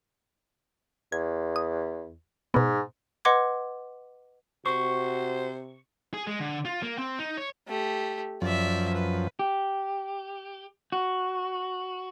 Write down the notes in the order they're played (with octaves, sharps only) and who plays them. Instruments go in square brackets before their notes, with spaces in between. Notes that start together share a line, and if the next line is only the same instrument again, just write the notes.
[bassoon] E2 [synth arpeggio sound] G#6
[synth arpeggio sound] D#6
[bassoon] G#2 [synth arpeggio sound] B2 B3
[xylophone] B4 D#5 F#5 C6 D6 G#6
[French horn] C3 [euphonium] F#4 [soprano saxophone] C5 [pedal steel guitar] C#6
[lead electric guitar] G#4
G#3
D3
F4
A#3
C4
D#4
C#5
[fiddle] A3 G4
[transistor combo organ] F#2 F3 [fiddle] D5 E5
[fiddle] B4
[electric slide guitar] G4
F#4